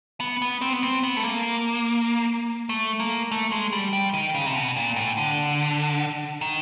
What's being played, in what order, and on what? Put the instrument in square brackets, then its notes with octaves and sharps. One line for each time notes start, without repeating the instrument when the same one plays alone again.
[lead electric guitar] B3
B3
C4
B3
C4
B3
A3
A#3
A3
A#3
A3
G#3
G3
G3
D#3
C#3
C3
B2
A#2
A2
D3
D#3